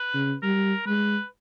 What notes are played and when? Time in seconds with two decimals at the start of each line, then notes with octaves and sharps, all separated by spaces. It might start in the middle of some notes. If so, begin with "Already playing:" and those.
Already playing: B4
0.14 C#3
0.42 G3 A#4
0.86 G#3 B4